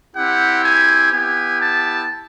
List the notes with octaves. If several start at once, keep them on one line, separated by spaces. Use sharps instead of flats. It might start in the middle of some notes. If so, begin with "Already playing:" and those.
C4 E4 G4 F#5
G#5
B3 E4 G4 G#5
A5